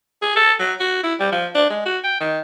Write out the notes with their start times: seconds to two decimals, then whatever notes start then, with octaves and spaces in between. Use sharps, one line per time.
0.22 G#4
0.36 A4
0.60 F#3
0.80 F#4
1.03 E4
1.20 G3
1.32 F3
1.55 D4
1.70 G#3
1.86 F#4
2.04 G5
2.21 D#3